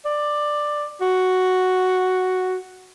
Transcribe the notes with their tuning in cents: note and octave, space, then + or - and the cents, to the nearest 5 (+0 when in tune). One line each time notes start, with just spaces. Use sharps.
D5 +10
F#4 +0